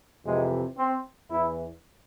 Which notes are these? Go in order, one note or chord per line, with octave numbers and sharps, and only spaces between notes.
F2 C3 E3 G#3
C4
E2 E3 E4